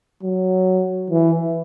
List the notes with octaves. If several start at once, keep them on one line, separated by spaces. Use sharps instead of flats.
F#3
E3